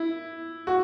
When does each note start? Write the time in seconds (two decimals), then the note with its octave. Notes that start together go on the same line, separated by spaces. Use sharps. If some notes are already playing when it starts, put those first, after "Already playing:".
Already playing: E4
0.67 F#4